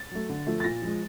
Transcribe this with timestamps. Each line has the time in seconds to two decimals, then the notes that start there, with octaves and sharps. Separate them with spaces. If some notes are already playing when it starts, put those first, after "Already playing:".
Already playing: A6
0.11 F#3 A3
0.29 D3
0.47 F3 A3
0.60 A6
0.64 A#2 A#6
0.82 F3 G#3